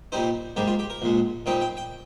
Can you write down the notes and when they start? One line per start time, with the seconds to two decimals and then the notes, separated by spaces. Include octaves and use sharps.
0.12 A#2 G3 C4 D#4 C5
0.56 G#2 G3 A#3 G4
0.67 F4
0.79 G4
0.90 A#4
1.02 A#1 A#2 G#3
1.46 A#2 G3 C4 D#4 G5
1.61 G5
1.77 G5